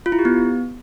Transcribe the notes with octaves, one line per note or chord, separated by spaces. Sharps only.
F4
E4
G4
B3